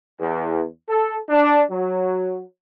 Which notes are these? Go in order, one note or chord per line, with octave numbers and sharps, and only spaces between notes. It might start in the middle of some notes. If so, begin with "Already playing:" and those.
E2
A4
D4
F#3